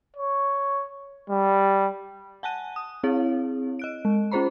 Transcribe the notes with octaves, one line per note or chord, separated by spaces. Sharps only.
C#5
G3
F#5 G#5 A5 F#6 D#7
D#6
C4 E4 G#4 C#5 F5
D#5 F#6 D7
G#3
C#4 F4 G#4 C5 A#5 B5